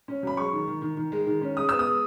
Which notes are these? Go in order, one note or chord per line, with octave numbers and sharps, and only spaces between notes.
C#4
F#3 B5
G#3 C#6
D#3
D#3
D#3
D#3
G#3
D#3
C#4
G#3 D#6
B3 E6
D#6
G#3